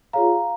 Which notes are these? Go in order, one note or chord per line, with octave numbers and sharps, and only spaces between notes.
F4 G#4 C#5 F5 A#5